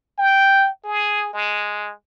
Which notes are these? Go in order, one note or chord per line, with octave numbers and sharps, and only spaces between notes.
G5
G#4
G#3